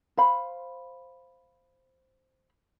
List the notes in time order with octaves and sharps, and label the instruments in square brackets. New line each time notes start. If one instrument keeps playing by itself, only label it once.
[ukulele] C5 F5 B5